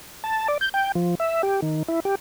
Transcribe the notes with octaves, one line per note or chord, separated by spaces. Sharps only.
A5
D5
G6
G5
F3
E5
G4
D#3
E4
G4